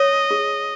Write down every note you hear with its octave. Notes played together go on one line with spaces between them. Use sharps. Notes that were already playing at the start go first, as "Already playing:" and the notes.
Already playing: C#5 D#5
G#4